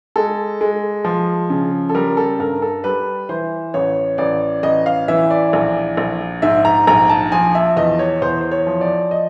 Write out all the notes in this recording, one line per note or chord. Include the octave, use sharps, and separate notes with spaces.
G#3 A4
G#3
F3
C#3
A4
G3 A#4
A4
G2 A#4
A4
G3 B4
E3 C5
A1 C#5
A1 D5
A1 D#5
F5
E3 E5
D5
A#1
A#1
G#2 E5
A#5
A#1 A#5
A5
F3 G#5
E5
E2 D#5
C#5
E2 C5
C5
C#5
F3
D5
D#5